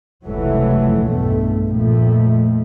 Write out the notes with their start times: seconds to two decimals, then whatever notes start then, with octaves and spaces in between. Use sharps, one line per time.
0.25 F1 C#2 F#2 E3 F#3 A3
1.06 B1 E2 G2 B2 A3
1.67 F2 A#2 D#3 F3 A3